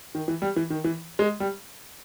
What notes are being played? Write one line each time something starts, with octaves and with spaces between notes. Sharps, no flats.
D#3
E3
G3
E3
D#3
E3
G#3
G3